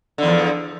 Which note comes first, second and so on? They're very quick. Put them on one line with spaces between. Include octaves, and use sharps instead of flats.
D3 E2 F3